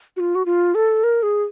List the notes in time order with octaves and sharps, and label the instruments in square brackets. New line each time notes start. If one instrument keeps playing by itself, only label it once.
[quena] F#4
F4
F#4
F4
A4
A#4
G#4